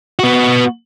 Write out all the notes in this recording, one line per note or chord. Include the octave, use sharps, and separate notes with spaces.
B3 F#4